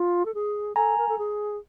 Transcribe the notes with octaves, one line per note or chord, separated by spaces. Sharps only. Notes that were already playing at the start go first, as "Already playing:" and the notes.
Already playing: F4
A4
G#4
A4 G#5 A#5
A#4
A4
G#4